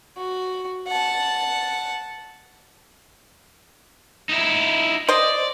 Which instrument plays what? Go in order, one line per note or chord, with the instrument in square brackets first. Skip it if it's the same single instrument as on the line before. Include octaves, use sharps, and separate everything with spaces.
[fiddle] F#4
F#5 A5
[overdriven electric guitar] D#4 E4
[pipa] C5 D#5 [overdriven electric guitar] D5